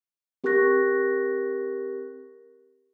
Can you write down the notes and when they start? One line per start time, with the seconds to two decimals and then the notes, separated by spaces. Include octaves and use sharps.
0.44 C4 G4 A#4 C#6 F#6 A#6